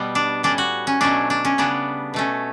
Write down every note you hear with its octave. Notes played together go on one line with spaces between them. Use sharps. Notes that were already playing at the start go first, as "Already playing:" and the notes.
Already playing: B2 G3 B3
D4
A2 G3 C#4 D4
F#4
C#4
B2 F#3 A3 C#4 D4
D4
C#4
C#3 G3 B3 D4
B2 A3 C#4